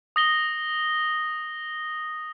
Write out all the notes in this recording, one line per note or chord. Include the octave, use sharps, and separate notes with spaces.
D#6 A#6 G7